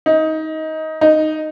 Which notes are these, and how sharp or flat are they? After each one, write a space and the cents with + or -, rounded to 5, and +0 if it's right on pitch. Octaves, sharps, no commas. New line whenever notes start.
D#4 +20
D#4 -5